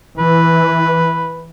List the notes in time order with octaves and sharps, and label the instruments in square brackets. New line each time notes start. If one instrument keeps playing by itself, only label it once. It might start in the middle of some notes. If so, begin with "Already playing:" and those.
[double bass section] E3 [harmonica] B4